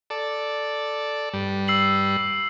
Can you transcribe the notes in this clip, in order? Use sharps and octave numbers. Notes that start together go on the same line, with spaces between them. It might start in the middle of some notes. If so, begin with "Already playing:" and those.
A4 D5
G2 G3
E6 C7 F#7